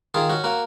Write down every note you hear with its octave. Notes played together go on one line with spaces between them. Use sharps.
D#3 F4 G#4
C#4 F#4
A#3 F#4